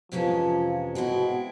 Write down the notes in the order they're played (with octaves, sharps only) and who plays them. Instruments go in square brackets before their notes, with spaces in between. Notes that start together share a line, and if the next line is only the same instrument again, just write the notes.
[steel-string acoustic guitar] F2 C3 E3 G#3 C#4 [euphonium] F3
[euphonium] B2 [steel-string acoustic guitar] G#3 C4 E4